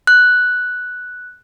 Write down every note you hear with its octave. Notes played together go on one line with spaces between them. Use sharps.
F#6